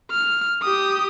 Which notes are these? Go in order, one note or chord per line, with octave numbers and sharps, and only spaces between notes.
F6
G4 D#6